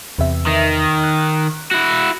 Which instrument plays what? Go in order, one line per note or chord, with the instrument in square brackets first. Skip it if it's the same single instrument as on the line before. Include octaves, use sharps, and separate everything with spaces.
[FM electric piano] E2 C3 E5
[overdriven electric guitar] D#3
[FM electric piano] F#6
[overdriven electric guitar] E4 F#4